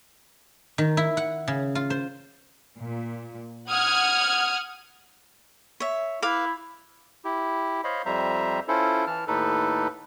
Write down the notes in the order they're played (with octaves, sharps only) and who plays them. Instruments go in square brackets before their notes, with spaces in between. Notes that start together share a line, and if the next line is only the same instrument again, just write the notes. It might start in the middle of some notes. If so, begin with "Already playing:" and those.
[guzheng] D#3
E4
F#5
C#3
F4
C5
[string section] A#2
F#5 D#6 F6 G#6
[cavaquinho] C#5 E5
[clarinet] E4 [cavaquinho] B4 F5 D6
[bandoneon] E4 G4
C5 C#5 D#5 F5 B5
F2 G3 C5 E5 A#5
C#4 E4 F4 A4 C5
E3 A5 F6
D#2 A2 D#4 A4 B4